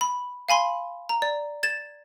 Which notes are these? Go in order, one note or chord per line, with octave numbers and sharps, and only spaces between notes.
B5
F5 G#5 B5 C6
A#5
D5
G#6 A6 E7